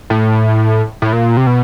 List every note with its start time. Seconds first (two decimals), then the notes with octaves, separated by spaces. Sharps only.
0.10 A2
1.02 A2
1.13 A#2
1.37 C3
1.47 B2